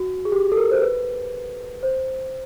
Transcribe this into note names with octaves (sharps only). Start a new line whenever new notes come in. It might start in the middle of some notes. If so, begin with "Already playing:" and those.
Already playing: F#4
G#4
G4
A4
A#4
C5
B4
C5